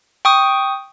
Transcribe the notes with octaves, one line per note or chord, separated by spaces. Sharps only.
G5 C#6 D#6